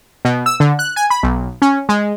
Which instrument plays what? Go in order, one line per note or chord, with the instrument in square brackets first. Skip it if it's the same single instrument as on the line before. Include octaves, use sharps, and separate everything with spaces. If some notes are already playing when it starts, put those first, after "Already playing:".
[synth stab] B2
E6
D3
F#6
G#5
B5
B1
C#4
G#3